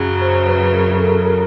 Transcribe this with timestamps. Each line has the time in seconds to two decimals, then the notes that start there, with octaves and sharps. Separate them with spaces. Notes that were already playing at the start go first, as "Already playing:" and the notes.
Already playing: F#2 C#3 F#3
0.21 C5
0.47 B4
0.74 A#4
0.99 A4
1.25 A#4